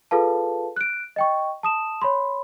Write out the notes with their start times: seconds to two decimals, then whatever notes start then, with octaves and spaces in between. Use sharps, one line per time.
0.11 F4 G#4 A4 B4 F5 A5
0.76 F#6 D7
1.16 D#5 G5 C#6
1.63 A5 D#6 E7
2.01 C#5 B5 C6